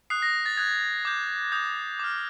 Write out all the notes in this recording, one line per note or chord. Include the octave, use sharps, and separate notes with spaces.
D#6 F#6 C7
A#6
A6
D#6 F#6 G#6
D6 G6
D#6 G6
D6 F6